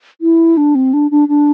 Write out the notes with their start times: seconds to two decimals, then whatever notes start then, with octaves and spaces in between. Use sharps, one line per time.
0.21 E4
0.57 D4
0.75 C4
0.93 D4
1.11 D4
1.28 D4